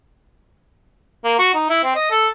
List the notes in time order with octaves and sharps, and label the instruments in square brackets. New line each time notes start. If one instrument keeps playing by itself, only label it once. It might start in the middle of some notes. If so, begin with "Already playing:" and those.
[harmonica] A#3
F#4
D#4
E4
C4
D#5
A4